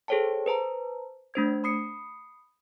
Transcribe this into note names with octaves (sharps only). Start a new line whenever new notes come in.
G#4 A4 C5 C#5 G5 A5
B4 C5 A5 A#5
A3 D4 C5 G#6
B5 D#6 C7 C#7